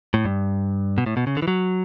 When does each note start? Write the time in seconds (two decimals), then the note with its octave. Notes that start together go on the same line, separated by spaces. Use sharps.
0.14 A2
0.25 G2
0.98 B2
1.06 A2
1.17 B2
1.27 C#3
1.37 D3
1.42 E3
1.48 F#3